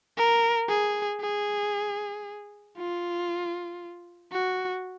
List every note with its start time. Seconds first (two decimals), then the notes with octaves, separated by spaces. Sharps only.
0.17 A#4
0.69 G#4
1.21 G#4
2.77 F4
4.32 F#4